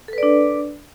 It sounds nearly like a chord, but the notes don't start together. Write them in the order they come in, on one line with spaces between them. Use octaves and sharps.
A4 B4 D5 D4